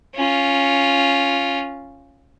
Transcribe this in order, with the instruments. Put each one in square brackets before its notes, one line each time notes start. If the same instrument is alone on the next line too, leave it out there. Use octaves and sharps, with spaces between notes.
[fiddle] C#4 F4